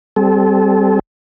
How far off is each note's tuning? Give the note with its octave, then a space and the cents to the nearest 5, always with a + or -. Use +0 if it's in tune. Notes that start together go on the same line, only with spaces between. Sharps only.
G3 +0 C4 +0 A4 -30